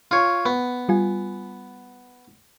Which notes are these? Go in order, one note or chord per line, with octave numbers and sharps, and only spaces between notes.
F4 C#5
B3
G3 F4 G#5